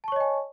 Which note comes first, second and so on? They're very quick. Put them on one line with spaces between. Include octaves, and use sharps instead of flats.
A5 C#6 C#5 D#5 G#5